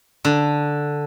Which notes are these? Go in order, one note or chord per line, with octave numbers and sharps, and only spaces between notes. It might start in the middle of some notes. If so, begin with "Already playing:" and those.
D3